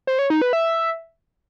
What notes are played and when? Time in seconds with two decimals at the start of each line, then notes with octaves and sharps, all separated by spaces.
0.07 C5
0.19 C#5
0.30 D#4
0.42 B4
0.53 E5